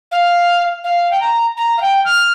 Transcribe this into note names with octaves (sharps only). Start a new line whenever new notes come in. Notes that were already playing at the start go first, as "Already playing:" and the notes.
F5
F5
G5
A#5
A#5
F5
G5
F6